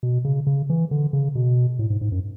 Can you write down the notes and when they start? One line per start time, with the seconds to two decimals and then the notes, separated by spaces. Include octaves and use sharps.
0.03 B2
0.25 C#3
0.47 C#3
0.70 E3
0.91 D3
1.13 C#3
1.35 B2
1.79 A2
1.90 G#2
2.01 G#2
2.12 F#2